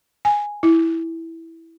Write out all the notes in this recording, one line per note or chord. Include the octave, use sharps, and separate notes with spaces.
G#5
E4